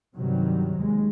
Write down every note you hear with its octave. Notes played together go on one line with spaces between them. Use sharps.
G2 C3 D#3 F#3 G3
D#2 G#3